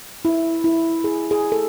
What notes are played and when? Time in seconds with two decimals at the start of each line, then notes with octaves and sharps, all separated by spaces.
0.25 E4
0.64 E4
1.04 G#4
1.31 G#4
1.52 A4